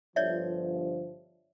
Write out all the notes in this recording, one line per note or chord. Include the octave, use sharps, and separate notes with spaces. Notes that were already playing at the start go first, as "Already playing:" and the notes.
G1 F3 C#5 D5 E5